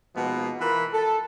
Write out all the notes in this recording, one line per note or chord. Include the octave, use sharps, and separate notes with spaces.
B2 F3 G#3 A#3 B3 D#4
E3 F4 A#4 B5
A4